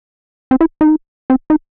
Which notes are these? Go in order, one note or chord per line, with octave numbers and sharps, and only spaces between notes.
C4
E4
D#4
C4
D#4